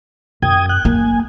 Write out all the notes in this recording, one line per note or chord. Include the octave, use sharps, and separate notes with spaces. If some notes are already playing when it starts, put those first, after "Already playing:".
F#2 G5 D#6 G#6
G5 F#6
A#3 G#5